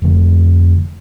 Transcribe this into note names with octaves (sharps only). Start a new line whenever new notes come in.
F1 F2 D3 A3